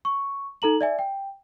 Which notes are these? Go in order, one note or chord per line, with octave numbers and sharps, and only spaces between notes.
C#6
D#4 A4 A#5 F#7
D5 E5 G#5
G5